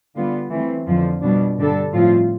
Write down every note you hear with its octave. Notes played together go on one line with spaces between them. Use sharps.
D3 G3 B3 F4
E3 A3 C4
F2 D3 F3
B2 G3 D4
G2 D3 G3 D4 A4
A2 F3 C4 F4